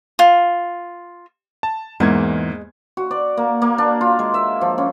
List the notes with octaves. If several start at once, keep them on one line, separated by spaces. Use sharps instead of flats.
F4
A5
E2 G#2 E3 G#3 A#3 G#6
F#4
D5
A#3
A#3
D4
F4
G#3
E5
F3
C#4